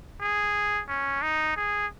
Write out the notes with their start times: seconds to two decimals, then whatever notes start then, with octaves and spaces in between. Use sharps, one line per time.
0.21 G#4
0.88 C#4
1.22 D#4
1.56 G#4